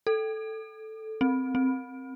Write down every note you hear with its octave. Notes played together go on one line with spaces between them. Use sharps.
A4
C4
C4